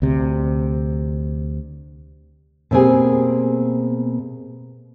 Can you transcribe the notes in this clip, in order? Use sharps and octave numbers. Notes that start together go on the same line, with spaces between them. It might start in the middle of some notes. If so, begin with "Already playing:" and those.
D2 C3
B2 A#3 C4 E4 G4 G#4